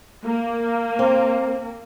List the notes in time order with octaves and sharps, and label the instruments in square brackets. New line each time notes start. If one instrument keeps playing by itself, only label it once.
[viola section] A#3
[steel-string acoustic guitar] C4